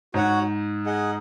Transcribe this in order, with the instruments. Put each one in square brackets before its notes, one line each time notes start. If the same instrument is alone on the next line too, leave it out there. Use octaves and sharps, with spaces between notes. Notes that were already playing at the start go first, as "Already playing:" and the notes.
[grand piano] G#2 [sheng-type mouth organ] F#4 C#5 F#5
[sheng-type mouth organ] G#4 D#5 F#5